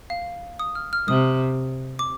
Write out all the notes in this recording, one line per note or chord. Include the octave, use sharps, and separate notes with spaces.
F5
D#6
F6
F6
C3 D#6
D6